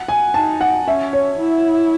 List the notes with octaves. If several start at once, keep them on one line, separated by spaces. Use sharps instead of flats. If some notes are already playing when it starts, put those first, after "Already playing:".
Already playing: F#5
G#5
D#4 A5
F#5
C#4 E5
C#5
E4